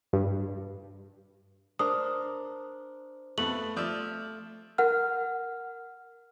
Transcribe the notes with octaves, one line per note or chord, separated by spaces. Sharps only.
G2
D4 A#4 C5 D#6
F2 A3 B3 F#7
F3 D5 E5 D#6
A#4 F#5 F6